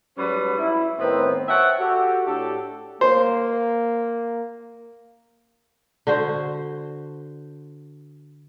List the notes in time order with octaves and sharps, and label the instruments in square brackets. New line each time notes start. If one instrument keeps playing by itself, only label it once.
[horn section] G#2 F#3 G3 C#4 B4
E4
A2 D#3 B3 C4
C5 C#5 E5 F#5 G5 A5
F#4 G4 A4
A2 D4 G4 A4
[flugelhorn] A#3 [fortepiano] C5
[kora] D3 F#4 C5